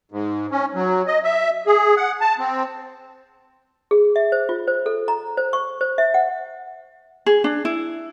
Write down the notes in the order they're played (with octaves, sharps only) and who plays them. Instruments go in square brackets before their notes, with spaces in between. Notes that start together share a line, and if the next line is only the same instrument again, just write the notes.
[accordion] G#2
C#4
F#3
D#5
E5
G#4
F#5
A5
C4
[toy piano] G#4
E5
C5
F4
C5
A4
A#5
C5
C#6
C5
E5
F#5
[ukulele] G#4
D4
E4